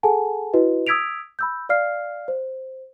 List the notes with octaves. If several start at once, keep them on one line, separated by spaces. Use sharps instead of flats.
G#4 A4 F#5 G#5 A5
E4 F#4 B4 D#5
D#6 E6 G#6 B6 D7 F7
B5 E6 G6
D5 F5 F6 C7
C5